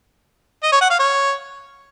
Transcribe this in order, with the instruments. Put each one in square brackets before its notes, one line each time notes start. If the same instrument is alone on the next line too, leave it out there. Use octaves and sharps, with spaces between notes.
[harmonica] D#5
C#5
F#5
F5
C#5